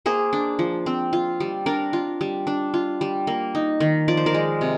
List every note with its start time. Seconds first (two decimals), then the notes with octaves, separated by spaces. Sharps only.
0.06 A#3 G#4 C5
0.33 D4
0.59 F3
0.86 C4
1.13 F4
1.40 G3
1.66 D4 A#4 D5
1.93 F4
2.21 G3
2.47 D4
2.74 F4
3.01 G3
3.27 A#3
3.55 D#4
3.80 D#3
4.08 F3 D5
4.17 C5
4.26 A#4 D5
4.34 G#3
4.61 C3